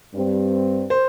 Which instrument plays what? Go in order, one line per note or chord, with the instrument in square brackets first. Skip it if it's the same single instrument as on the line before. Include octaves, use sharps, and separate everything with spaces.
[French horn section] G2 G3 C4
[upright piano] C5